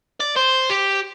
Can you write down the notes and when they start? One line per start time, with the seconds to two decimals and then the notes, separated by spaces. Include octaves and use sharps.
0.20 D5
0.37 C5
0.70 G4